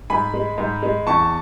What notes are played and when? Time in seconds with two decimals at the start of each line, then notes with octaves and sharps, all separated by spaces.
0.10 G#2 G#5 B5
0.34 G#3
0.58 G#2
0.83 G#3
1.07 E2 A5 C#6